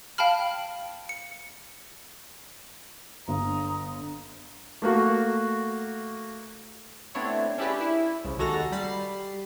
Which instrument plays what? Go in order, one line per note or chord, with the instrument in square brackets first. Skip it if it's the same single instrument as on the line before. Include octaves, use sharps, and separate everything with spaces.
[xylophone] F5 G5 A5 B5 F6
C#7
[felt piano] G1 [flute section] A#5 D#6
[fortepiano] A3 A#3 F#4
[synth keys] A3 B3 C4 D4 E4 C#5
C#4 D4 E4 G4 G#4 B4
E4
C2 C#3
D#2 G#3 F#4 A4 A#5 A#6
G3 B5 A6 C7